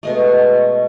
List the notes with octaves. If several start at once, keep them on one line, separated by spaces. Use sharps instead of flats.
B2 G#3 A3